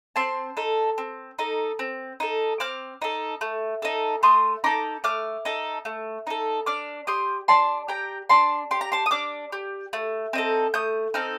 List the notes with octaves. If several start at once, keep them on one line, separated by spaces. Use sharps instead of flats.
C4 A5 C6
D#4 A4
C4
D#4 A4
C4
D#4 A4
C4 D6 F6
D#4 A4
A3
D#4 A4
A3 C6 D#6
D#4 A4 A#5 D6
A3 D6 F6
D#4 A4
A3
D#4 A4
D4 D6 F6
G4 C6 D#6
D4 A5 C6
G4 G5 A#5
D4 A5 C6
G4 C6
A#5
A5 C6
D#6
D4 D6 F6
G4
A3
C4 D#4 A4
A3 D#6 G6
C4 D#4 A4 F6